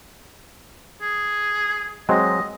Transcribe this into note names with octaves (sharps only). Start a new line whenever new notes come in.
G#4
F#3 G#3 C4 D#5